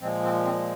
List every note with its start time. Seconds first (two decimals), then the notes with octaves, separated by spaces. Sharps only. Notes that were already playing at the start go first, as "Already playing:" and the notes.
0.01 A#2 F3 G#3 C4
0.24 C4
0.45 C4